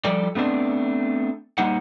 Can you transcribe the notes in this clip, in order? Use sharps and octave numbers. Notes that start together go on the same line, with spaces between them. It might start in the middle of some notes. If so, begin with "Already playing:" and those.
F3 G3 A4 D5 G5
A3 B3 C4 D4
G3 A#3 D#4 C5 F#5